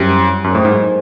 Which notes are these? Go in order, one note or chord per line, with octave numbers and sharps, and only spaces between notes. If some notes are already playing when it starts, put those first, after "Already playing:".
Already playing: F#2 G3 C4 E4 G4
F#2 F#3 A#3 D#4 G#4 C5
A2
G#2